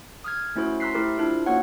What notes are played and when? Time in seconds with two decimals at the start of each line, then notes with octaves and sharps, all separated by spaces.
0.24 D#6 F6 G#6
0.56 A3 C#4 E4 F#4 C5
0.80 A#5 C6 E6 F#6 B6 C7
0.94 A3 E4 G4 A#4 C5
1.18 D4 E4 F4 A#4 C5
1.46 A#3 C#4 F#4 C#5 F#5